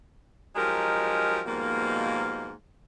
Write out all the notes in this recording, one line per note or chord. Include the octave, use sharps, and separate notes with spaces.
F3 F#3 G#3 D#4 G4 A#4
G#2 B2 F3 G3 A#3